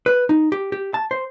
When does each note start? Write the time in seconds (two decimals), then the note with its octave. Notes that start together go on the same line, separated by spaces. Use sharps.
0.06 B4
0.29 D#4
0.52 G4
0.72 G4
0.94 A5
1.11 C5